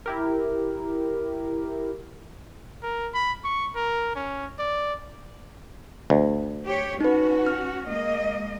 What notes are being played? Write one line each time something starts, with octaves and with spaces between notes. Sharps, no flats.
E4 G4 A#4
A#4
B5
C#6
A#4
C#4
D5
D2
G4 C#5
C#4 D#4 F#4 B4
F6
G#3 A#3 D#5